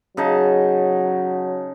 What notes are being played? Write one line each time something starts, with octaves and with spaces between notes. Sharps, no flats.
C#3 F#3 D#4 A5